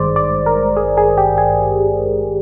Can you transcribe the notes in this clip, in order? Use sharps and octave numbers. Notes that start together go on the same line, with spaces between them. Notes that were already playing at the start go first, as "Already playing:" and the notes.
Already playing: G#1 G2 D#3 G#3 C5 D5
D5
A#4
G#4
G#4
G4
G#4